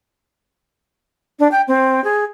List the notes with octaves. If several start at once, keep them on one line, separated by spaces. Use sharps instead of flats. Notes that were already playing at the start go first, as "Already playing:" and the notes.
D4
G5
C4
G#4